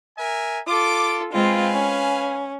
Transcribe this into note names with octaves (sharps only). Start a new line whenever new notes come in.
A#4 E5 G#5
F4 A4 D6
G#3 C4 F4 B4 F5 G#5
C#4